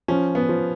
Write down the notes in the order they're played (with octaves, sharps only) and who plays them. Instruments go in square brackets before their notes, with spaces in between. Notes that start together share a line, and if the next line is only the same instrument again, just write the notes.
[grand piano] F3 [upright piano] C#4
[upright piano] B3
[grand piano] F3